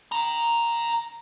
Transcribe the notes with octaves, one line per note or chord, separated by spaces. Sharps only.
G5 A#5